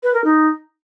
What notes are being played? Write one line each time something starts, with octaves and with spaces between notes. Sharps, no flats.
B4
A#4
D#4